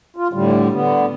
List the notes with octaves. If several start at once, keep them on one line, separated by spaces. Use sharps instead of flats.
F4
A2 D3 G3
D3 B3